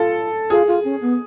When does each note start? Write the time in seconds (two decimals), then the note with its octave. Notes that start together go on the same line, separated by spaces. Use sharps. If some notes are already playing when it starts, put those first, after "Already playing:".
Already playing: F4 A4
0.50 F4 G#4
0.67 F4
0.84 C#4
1.01 B3